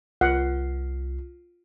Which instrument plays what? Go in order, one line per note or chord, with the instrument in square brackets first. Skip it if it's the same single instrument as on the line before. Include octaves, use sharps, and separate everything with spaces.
[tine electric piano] C2 [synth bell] F4 [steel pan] F#5